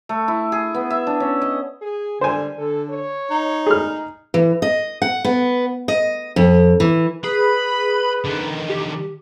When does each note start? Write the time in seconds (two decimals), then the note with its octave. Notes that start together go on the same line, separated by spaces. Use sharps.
0.09 A3
0.28 E4
0.52 G#4
0.74 B3
0.90 E5
1.07 D4
1.20 C#4
1.42 D#5
1.81 G#4
2.21 D3 G3 C5 G#5
2.58 D3 A4
2.90 C#5
3.30 D#4
3.66 G#4 F6
4.34 E3
4.62 D#5
5.02 F#5
5.25 B3
5.88 D#5
6.36 F2
6.80 E3
7.24 G#4 B4 B5
8.25 D3 D#3
8.70 G4